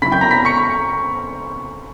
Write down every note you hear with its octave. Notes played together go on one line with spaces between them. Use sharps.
C#3 F#3 C#4 E4 B5 B6
G5 G6
A#5 A#6
B5 B6
C#6 C#7